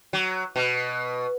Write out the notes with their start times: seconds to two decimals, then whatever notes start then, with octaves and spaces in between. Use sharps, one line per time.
0.13 F#3
0.56 B2